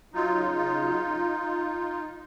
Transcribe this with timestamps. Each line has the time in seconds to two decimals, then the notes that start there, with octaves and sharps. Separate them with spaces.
0.14 F#3 D#4 F4
0.36 C#3
0.60 C#3
0.82 F#3